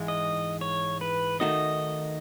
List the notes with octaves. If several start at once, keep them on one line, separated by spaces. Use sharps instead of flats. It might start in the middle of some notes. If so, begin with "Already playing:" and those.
Already playing: G#2 E3 G#3
D#5
C#5
B4
D#3 A3 D#4 F#4 D#5